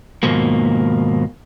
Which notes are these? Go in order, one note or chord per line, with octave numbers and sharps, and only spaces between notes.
D#2 G#2 B2 F3 A#3